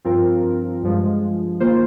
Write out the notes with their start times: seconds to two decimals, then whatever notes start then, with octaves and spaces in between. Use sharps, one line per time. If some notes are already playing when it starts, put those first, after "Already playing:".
0.05 G2 F3 C4 F4 A#4
0.83 G2 F3 G#3
1.60 D#3 A#3 F4 C5